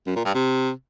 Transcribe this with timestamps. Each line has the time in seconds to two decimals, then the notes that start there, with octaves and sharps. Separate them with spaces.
0.07 F#2
0.16 A#2
0.25 G2
0.34 C3